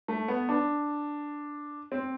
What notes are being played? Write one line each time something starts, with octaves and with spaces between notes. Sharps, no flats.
A3
B3
D4
C4